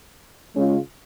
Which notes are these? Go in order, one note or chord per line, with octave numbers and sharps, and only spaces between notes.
C#3 G#3 C#4 F4